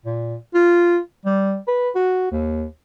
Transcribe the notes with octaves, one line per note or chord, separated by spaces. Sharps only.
A#2
F4
G3
B4
F#4
D#2